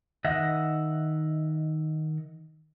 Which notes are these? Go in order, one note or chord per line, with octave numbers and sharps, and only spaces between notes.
D#3 D#5 E5 F#5